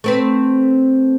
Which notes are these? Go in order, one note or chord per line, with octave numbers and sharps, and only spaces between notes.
A3 C4 B4